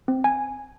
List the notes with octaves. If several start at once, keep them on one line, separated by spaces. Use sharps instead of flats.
C4
G#5